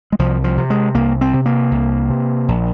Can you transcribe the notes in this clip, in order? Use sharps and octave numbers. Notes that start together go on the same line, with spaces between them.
G#3
C2 F3
F3
C3
G#3
C2 A#3
C4
C3
A#3
C2
C3
A#1